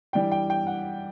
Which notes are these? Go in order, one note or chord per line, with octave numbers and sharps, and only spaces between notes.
E3 G3 D4 G5
G5
G5
F#5